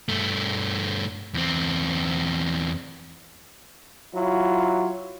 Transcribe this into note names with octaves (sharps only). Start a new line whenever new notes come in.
G2 A3
E2 C4
F#3 E4 F4